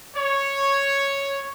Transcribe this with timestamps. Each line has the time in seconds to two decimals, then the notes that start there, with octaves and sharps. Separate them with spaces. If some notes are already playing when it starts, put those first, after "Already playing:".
0.15 C#5